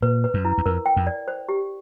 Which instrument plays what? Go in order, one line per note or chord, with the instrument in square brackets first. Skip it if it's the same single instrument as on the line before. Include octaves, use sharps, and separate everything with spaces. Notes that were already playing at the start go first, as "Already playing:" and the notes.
[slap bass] A#2 [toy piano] B4
[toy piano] B4
[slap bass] F#2
[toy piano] E4
[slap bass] E2
[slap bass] F2 [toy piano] A#4
[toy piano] G5
[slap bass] F2
[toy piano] D5
C5
G4